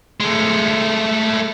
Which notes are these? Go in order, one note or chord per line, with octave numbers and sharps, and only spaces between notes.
G#3 A3